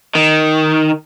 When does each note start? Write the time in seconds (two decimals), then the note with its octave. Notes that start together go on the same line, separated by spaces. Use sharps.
0.16 D#3